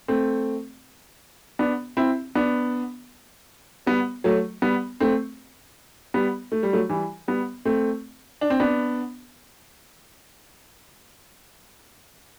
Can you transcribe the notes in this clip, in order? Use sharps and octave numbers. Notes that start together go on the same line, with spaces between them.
A3 C4
B3 D4
C4 E4
B3 D4
G3 B3
F#3 A3
G3 B3
A3 C4
G3 B3
A3
G3
F#3 A3
E3 G3
G3 B3
A3 C4
D4
C4
B3 D4